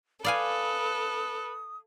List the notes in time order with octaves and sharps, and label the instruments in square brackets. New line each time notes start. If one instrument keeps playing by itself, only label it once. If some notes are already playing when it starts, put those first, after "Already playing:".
[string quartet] A4 [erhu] B4 [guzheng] D5 F5 G#5 [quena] D#6